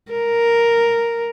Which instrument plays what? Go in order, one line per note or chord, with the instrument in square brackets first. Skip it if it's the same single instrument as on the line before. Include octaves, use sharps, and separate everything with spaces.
[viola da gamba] A#4